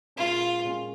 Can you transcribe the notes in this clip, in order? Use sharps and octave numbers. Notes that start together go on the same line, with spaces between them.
A#2 G#3 C#4 F4
A#2 G#3 C#4